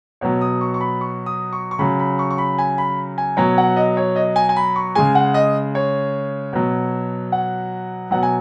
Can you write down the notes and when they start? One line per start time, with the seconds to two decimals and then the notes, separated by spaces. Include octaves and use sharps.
0.21 B2 F#3 C#5
0.41 D#6
0.61 C#6
0.74 C#6
0.80 B5
1.01 C#6
1.26 D#6
1.53 C#6
1.71 C#6
1.79 C#3 F#3 B5
1.99 B5
2.19 C#6
2.30 C#6
2.38 B5
2.58 G#5
2.78 B5
3.18 G#5
3.37 B2 F#3 C#5
3.58 F#5
3.76 D#5
3.97 C#5
4.16 D#5
4.36 G#5
4.49 G#5
4.56 B5
4.76 C#6
4.95 C#3 G#3 G#5
5.15 F#5
5.34 D#5
5.75 C#5
6.53 B2 F#3
7.32 F#5
8.11 B2 F#3 F#5
8.23 G#5